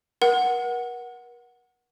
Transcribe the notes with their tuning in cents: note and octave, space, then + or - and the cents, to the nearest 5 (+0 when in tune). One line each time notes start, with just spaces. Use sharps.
A#4 +40 F#5 +0